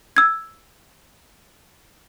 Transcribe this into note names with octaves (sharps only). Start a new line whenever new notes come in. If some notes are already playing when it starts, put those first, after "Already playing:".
E6 G#6